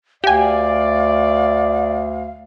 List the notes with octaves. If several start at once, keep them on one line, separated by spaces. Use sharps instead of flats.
D2 G4 D5 F5 G#5